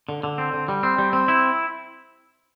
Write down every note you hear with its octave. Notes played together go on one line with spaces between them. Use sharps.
D3
D3
C4
D3
G3
C4
G3
C4
E4